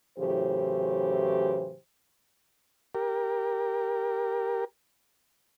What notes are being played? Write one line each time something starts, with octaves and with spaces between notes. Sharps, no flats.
A2 C#3 E3 F#3 G4 C5
G4 A#4